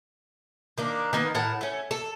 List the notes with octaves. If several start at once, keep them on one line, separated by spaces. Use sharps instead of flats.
D#3 A#3 D4
D#3 A#3 B3
A2 A#4 F#5 A5
A3 C#4
A4